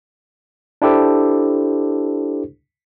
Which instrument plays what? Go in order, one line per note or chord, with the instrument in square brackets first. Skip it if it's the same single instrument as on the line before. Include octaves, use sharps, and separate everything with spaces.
[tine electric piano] D4 E4 G4 A4 C5